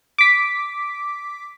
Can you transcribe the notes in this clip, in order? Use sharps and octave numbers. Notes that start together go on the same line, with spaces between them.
D6 B6